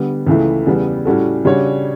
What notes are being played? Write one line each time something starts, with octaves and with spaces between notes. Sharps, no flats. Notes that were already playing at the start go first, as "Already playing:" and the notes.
Already playing: D3 G3 B3
C#2 C#3 E3 A3 E4
E2 C#3 G3 B3
A2 G3 C#4 F#4 A4
C#3 G3 D4 F#4 C#5